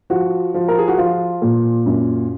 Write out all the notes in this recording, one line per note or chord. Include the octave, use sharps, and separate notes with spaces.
F3 F#4
F3
A#4
G#4
F#4
F3 F4
A#2
F#2